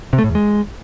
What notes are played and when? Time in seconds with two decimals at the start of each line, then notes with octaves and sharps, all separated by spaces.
0.13 C3
0.18 A3
0.24 A2
0.30 E2
0.35 G#3